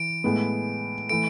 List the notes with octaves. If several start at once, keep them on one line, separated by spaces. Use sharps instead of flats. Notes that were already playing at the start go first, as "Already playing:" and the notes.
Already playing: E3 D7
A2 G#3 B3
E3 A3 D7